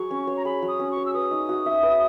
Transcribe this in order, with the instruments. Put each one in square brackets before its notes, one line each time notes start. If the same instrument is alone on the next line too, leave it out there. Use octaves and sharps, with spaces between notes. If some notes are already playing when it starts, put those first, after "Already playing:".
Already playing: [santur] F#3 G#4 [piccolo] C#6
[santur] C#4
C#5
[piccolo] A#5
[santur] G#4 [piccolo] B5
[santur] F#3
[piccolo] D#6
[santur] C#4
[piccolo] C#6
[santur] C#5
[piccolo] E6
[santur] B4 [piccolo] D#6
[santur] D#4
F#4
E5
B4